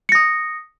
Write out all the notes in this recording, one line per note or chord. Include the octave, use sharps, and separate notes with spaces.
D#6 A#6 C#7